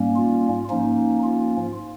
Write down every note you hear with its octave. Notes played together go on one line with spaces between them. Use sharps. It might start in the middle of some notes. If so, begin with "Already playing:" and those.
Already playing: G#2 G3 A#3 C#4
F4
G#2 F3 A#3 C#4 D#4
F4